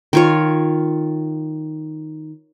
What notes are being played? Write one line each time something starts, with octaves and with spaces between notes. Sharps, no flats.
D#3 F4 C#5